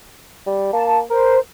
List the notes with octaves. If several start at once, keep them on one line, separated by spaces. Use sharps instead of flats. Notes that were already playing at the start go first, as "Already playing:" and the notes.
G3
A#3 A5
A#4 C5